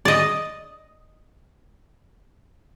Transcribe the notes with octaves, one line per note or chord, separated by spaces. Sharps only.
D5 D#5